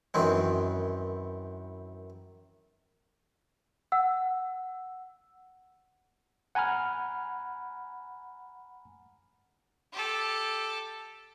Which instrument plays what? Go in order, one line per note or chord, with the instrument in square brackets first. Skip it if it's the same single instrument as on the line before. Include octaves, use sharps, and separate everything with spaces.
[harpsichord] F#2 D#3 E3 C4
[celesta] F#5 E6
[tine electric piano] F#5 G#5 A#5 B5 F6
[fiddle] G4 A4